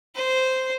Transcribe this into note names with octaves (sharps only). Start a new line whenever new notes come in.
C5